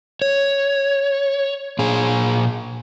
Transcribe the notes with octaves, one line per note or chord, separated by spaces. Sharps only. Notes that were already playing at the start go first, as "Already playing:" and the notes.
C#5
A#2 G#4